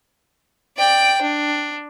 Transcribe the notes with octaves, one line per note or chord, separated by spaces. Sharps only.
D5 G5
D4